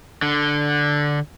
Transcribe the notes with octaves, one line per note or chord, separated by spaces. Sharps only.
D3